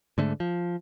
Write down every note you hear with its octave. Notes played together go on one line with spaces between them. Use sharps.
G#2 D3 A3
F3